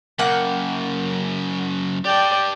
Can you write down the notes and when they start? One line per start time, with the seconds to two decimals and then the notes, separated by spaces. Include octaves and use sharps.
0.19 F#2 C#3 A#3 F#5 G5
2.05 G4 D5 G5 A5